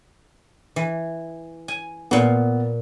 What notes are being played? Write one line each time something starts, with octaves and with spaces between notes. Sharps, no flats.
E3
G#5
A#2 A#3 B3